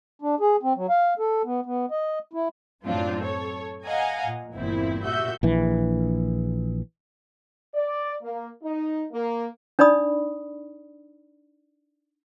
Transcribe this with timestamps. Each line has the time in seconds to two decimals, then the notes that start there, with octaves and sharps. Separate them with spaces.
0.22 D4
0.40 G#4
0.63 C4
0.76 F#3
0.90 F5
1.19 A4
1.45 B3
1.66 B3
1.91 D#5
2.33 E4
2.84 F#2 A2 F#3 C4 D4 F4
3.21 A4 C#5
3.85 D#5 F5 F#5 G#5 A#5
4.25 A#2
4.56 G1 E2 A#2 C4 E4
5.05 A#2 F#4 G4 E5 E6 G6
5.43 A#1 E3
7.75 D5
8.22 A#3
8.63 D#4
9.11 A#3
9.79 D4 D#4 D5 B5 D#6